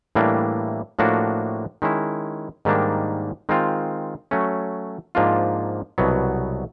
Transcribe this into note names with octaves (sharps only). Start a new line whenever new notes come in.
A2 E3 G3 A#3 D4
A2 F3 A#3 D4 F#4
D#3 G#3 C#4 E4
G#2 D#3 G3 A#3 D4
D#3 G#3 C4 F4
F#3 A3 C#4
G#2 F3 A#3 D4 F4
C2 B2 F#3 B3